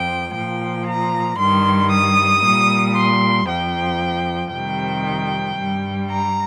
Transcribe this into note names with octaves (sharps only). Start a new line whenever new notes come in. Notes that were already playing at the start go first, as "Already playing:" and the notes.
Already playing: F2 F3 G5
A#2 F3 G5
A#5
G2 D#3 G3 C6
D#6
A#2 G3
C6
F2 F3 G5
F2 C3 D#3 G3 G5
G2 G3
A#5